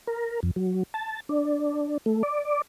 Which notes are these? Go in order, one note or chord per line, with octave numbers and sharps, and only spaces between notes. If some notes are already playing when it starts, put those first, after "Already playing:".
A#4
F2
F#3
A5
D4
A3
D5